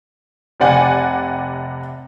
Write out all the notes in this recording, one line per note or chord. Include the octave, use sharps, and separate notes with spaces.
F1 C3 D5 F#5 G#5 F#6